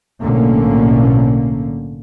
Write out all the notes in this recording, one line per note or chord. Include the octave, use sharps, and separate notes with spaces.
B1 A2 D3 A#3 C#4